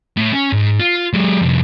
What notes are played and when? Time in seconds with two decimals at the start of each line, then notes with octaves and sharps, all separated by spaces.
0.17 A2
0.33 C#4
0.53 G#2
0.79 F4
1.13 F#3 G#3
1.42 C2 F2